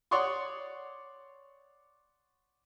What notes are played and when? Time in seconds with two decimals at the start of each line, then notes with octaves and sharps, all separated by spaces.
0.11 C#5 D5 F#5 C6 C#6 D#6